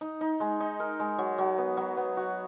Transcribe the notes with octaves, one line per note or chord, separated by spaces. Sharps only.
D#4
D#4
G#3
D#4
A#4
G#3
F#3
F#3
B3
F#3
B3
F#4